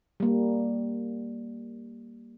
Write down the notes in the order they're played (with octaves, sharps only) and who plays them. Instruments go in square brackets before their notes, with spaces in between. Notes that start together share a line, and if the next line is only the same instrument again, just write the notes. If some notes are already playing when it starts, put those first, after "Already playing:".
[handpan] G3 A#3